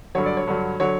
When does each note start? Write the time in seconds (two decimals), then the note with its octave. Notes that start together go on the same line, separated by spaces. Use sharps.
0.15 G2 D3 F#3 C#5
0.26 D5
0.37 C#5
0.47 G2 D3 F#3
0.80 D3 F#3 C#5